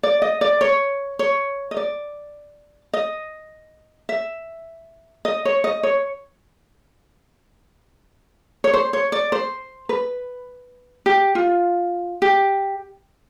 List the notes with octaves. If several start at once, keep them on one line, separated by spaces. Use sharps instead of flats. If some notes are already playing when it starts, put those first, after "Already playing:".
D5
D#5
D5
C#5
C#5
D#5
D5
D#5
E5
D#5
C#5
D#5
C#5
C#5
C5
C#5
D5
C5
B4
G4
F4
G4